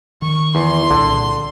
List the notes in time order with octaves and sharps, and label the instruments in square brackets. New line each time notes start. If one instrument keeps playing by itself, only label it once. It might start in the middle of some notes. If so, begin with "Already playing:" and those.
[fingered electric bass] D#3 [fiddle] C#6
[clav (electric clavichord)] E2 [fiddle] C6
[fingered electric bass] C2 A#2 [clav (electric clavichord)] D3